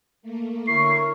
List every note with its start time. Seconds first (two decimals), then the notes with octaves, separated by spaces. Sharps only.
0.22 A3 A#3
0.67 D3 E4 A#4 C#5 C#6 C7